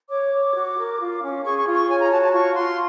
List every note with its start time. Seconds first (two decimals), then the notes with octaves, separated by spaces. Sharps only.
0.10 C#5 D6
0.32 C#5
0.54 F#4
0.77 A#4
0.99 F4
1.21 C#4
1.44 G#4 C#6
1.59 C#6
1.66 F4
1.74 C#6
1.88 C#5 G#5
2.00 A#5
2.11 F#4 A5
2.21 A5
2.33 F4 C#6
2.55 F4 C6